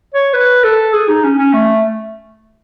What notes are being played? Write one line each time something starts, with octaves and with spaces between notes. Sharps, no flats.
C#5
B4
A4
G#4
D#4
C#4
C#4
A3